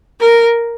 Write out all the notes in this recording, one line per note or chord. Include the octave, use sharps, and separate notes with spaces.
A#4